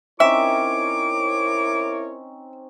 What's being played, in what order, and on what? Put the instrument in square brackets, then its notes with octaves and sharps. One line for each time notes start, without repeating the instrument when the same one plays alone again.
[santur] C4 C#4 D#4 [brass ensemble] E4 A#4 C#5 [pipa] E5 [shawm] D6